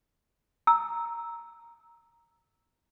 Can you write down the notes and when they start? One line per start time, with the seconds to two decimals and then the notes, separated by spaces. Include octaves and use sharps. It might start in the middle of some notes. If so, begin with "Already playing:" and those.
0.67 A#5 E6